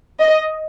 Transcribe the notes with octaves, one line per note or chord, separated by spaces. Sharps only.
D#5